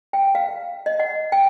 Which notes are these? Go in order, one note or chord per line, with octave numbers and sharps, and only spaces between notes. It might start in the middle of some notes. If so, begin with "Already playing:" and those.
G5
F5
D#5
F#5
G5